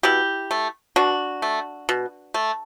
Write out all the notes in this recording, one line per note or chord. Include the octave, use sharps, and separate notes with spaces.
B2 E4 G4
A3
B2 D4 F#4
A3
B2
A3